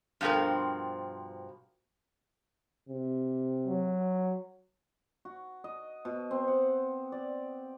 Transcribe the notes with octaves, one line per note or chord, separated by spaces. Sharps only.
G2 B2 F3 C4 A#4
C3
F#3
F#4
D#5
B2
C4
F#5
D5